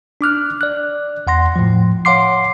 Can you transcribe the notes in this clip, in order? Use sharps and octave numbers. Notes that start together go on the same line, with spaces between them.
D4 D6 F6 F#6
D5 F#6
E2 F#5 C6 A#6
A2 F3
C#5 F5 F#5 C6 D6 C7